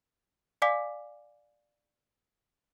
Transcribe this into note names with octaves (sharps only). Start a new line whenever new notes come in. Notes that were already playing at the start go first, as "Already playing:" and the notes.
D5 F5 G#5 D6 B6